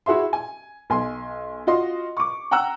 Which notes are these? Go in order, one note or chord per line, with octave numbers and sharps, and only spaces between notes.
E4 F#4 G#4 E5 C6
G#5
B1 G#5 C6
F4 F#4 D#5 C6
C#6 D6
F#5 G5 A#5 E6 F#6